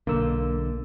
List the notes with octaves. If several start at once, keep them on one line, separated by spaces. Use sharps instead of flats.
B1 D3 A#3 E6